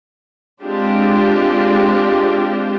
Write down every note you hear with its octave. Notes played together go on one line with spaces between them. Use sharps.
G#3 C4 D4 F4 G4